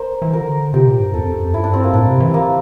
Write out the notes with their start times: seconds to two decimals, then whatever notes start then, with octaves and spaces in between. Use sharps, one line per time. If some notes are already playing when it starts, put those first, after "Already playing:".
Already playing: A#4 C5
0.22 E3
0.33 D3 A#4
0.74 C3 G4
0.87 A#2
1.00 G2
1.14 E2 A4
1.23 F2
1.34 G2
1.44 F2
1.54 G2 E4
1.64 D4
1.74 C4
1.84 A#3
1.94 A2 D4
2.07 C3
2.20 E3
2.34 A#3